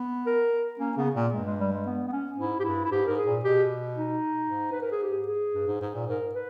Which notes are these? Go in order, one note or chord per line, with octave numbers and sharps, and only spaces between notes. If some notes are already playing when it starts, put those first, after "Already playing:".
Already playing: B3
A#4
A#3 C#4
C#3 B3
A#2 A#3
G2 G#3
G#3
G3
G#3
B3
B3
C#4
G#2 E4
G4
G2 E4
E4
G#2 G4
G#2 A#4
G#4
A#2
B2 G4
D#4
G#2
B4
A#4
G#4
G4
G#4
G2
G#2
G#2
A#2
G#2 A#4
B4